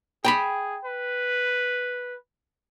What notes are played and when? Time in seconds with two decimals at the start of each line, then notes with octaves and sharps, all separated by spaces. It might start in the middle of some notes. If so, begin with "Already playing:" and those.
0.25 G#4 G5 A#5 B5
0.85 B4